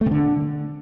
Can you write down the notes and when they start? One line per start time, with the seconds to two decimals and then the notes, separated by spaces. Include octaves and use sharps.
0.01 A3
0.06 C3
0.11 D3